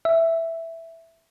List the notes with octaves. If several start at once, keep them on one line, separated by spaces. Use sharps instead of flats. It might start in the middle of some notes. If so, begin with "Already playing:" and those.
E5